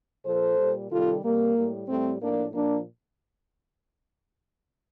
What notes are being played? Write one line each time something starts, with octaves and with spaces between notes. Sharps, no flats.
A#2 F3 A4 C5
A#2 G3
C3 D#3 G3 F4 A4
C3 G3 A#3
A2 G3
A2 G3 A3 C4
A2 F3 A#3 D4
A#2 F3 A#3 D4